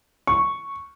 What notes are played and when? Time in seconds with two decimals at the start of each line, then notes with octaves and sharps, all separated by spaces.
0.27 C#6